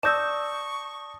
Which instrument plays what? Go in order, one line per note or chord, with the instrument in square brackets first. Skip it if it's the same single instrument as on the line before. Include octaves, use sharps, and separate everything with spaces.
[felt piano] D5 [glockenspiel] A5 D#6 A#6 [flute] C#6 [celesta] E6 G6 E7